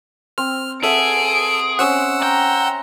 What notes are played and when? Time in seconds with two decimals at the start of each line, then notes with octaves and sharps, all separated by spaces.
0.38 C4 F6
0.83 G#4 A4 E5 F#5 D7
1.79 C4 C#4 C5 F#5 E6
2.23 G5 A#5